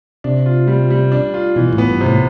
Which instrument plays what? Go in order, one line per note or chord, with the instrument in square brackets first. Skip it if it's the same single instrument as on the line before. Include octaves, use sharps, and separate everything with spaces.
[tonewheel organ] C3 [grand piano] D4
[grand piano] F4
G3
G3
D4
F4
[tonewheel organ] B2 [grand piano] E3
[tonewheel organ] A2
[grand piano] B3
[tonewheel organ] G2
[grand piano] C3
[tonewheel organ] A2